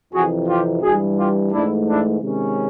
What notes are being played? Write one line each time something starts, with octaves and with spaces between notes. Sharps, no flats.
F2 C3 E3 F#4 G#4
F4 G4
G2 E3 G3 F#4 G#4
F4 G4
G#2 E3 A3 D4 E4
D4 E4
C3 D#3 G#3 C#4